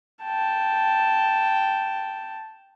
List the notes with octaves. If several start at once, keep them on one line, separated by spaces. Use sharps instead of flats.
G5 A5